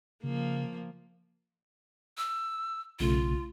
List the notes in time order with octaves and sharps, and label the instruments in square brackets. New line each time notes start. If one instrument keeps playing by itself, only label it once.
[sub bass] C#3 [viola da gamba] F3 A#3
[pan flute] E6
[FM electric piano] B1 C#3 A3 [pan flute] F4